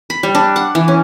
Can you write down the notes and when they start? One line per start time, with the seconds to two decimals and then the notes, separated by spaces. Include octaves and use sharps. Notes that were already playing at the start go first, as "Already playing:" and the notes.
0.10 B5
0.23 G3
0.35 D4
0.56 F#5
0.75 E3
0.88 C#4